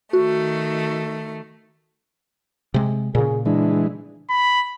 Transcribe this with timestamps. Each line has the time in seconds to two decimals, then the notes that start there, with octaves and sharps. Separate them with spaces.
0.13 D#3 A3 F#4
2.74 C3 G#3
3.15 A#2 C#3 G#4
3.46 E3 G#3 D4
4.30 B5